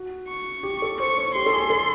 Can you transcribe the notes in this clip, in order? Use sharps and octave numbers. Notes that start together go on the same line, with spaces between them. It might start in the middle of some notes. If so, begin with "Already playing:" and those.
Already playing: F#4
C#6
G4
A4
C5 C#6
C#5
G4 C6
A4
G#4
A4